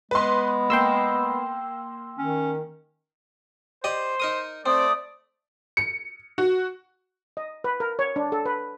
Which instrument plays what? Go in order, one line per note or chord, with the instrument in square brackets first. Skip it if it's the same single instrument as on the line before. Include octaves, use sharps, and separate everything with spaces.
[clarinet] G#3 [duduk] B3 [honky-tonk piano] B4 C6
[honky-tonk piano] A#3 [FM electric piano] G5 C6 E6
[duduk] D#3 [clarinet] C#4
[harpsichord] G4 D5 D#5 [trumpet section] C5
[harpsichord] D#4 A#4 D#6
[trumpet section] A3 D5 [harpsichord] C4 [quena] D#6
[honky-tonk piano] C#7
F#4
[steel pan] D#5
B4
A#4
C#5
D4
A4
B4